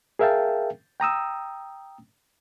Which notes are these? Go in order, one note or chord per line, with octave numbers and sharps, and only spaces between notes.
G#4 A#4 E5 F5 G5 A5
G5 A#5 D#6 E6